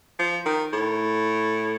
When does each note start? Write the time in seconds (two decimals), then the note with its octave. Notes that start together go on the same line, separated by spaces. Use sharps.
0.19 F3
0.46 D#3
0.73 A2